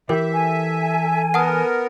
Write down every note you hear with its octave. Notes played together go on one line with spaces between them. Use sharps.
E3 G4 A#4 E5
A4 G#5
B3 A#4 F#5 A5 D#6